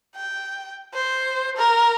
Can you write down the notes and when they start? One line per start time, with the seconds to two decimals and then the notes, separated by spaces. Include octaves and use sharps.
0.16 G5
0.94 C5
1.57 A#4